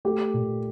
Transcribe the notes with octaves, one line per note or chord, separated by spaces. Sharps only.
A3 G4
A#2